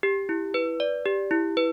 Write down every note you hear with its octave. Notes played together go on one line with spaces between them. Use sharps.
G4
E4
B4
D5
G4
E4
B4